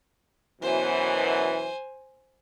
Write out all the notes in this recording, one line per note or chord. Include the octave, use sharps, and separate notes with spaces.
F#2 B2 E3 C5 G#5